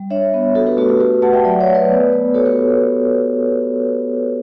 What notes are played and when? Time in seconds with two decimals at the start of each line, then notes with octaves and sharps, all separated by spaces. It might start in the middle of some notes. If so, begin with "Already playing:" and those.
Already playing: G3
0.10 D4 C#5 E5
0.34 B3
0.55 F#4 A4
0.67 G4 B4
0.78 A3 F#4 A4
0.89 G4
1.00 F#4 G4 B4
1.22 A3 F#5 A5
1.33 E5 G5
1.45 F#3 D5 F#5
1.60 C#5 E5
1.68 A3
1.75 B4 D5
1.90 B3
2.12 B3
2.34 F#4 A4 C#5
2.46 G4 B4